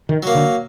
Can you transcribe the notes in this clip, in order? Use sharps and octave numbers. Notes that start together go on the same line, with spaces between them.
D#3
F#3 A#3
D3